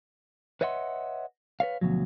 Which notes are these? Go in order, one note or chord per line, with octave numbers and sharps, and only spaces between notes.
B4 C#5 D#5 E5 F#5 C6
B4 C#5 F5
D2 B2 F3 F#3